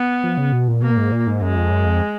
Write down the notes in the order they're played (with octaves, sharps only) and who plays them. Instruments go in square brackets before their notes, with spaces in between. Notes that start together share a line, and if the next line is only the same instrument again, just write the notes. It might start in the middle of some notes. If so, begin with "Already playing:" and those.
Already playing: [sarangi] B3
[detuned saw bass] F3
C#3
B2
A#2
[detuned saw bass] B2 [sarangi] A#3
[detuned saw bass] A#2
G#2
A#2
G#2
[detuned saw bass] F#2 [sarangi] G#3
[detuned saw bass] F2
F#2
F2